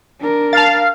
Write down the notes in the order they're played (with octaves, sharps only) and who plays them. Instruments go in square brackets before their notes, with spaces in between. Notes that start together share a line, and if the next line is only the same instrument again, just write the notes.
[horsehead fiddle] D4 A#4
[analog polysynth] F5 [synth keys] A5 A6